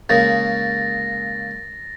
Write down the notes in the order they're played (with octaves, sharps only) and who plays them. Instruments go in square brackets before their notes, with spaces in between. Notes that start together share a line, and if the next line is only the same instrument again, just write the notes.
[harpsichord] C#3 G#3 A#3 [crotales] A6 A#6